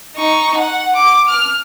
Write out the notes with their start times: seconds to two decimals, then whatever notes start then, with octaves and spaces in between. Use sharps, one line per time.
0.17 D#4 C#6
0.58 F#5
0.96 D6
1.29 F6